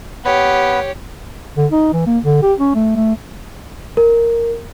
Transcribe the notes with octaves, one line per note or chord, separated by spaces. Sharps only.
B3 G4 B4 C#5
D3
D#4
E3
A#3
D3
G4
C#4
A3
A3
A#4